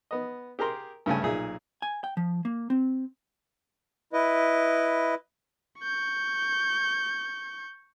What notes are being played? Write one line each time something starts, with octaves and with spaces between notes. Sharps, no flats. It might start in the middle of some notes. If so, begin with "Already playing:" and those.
B3 D#5
G4 G#4 A#4 A#5 C6
G2 C#3 A3 G#5
B1 A#2 G#4 E5
G#5
G5
F3
A#3
C4
E4 B4 D#5
C#6 G6